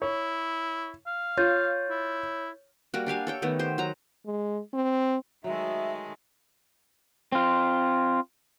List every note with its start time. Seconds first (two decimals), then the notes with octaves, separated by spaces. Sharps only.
0.02 E4 C#5
1.06 F5
1.37 F4 C#5 G6 A6
1.90 E4
2.94 G3 A#3 F#4
3.07 D4 G4 F5 G#5
3.27 A4 C#5 G5
3.42 D#3 A3 B3
3.59 G4 C5
3.78 F#3 A#5
4.26 G#3
4.73 C4
5.44 D#3 F#3 G#3 A3 E5
7.32 C4 F4